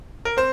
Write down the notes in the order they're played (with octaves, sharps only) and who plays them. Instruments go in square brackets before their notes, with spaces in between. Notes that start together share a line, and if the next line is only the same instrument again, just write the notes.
[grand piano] A#4
C4 C5